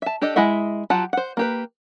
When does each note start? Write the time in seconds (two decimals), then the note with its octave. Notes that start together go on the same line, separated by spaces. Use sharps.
0.02 E5 A5
0.21 D4 G4 A4 D#5
0.36 G#3 E4 D#5 E5 F#5
0.90 F#3 F4 G4 F#5 A5
1.13 C5 F#5
1.37 A#3 G4 B4